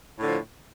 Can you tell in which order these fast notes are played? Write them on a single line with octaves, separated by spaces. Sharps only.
A2 D3 F3